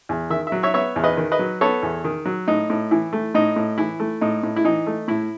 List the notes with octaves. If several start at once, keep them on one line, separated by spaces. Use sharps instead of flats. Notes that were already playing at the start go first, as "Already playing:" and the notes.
E2
D#3 E5
E5
F#3
C#5 E5
B3 C#5 E5
E2
B4 D#5
D#3
B4 D#5
F#3
B3 A4 C#5
E2
D#3
F#3
A2 D#4
A2
E3 E4
A3
A2 D#4
A2
E3 E4
A3
A2 D#4
A2
E4
E3 D#4
A3
A2 E4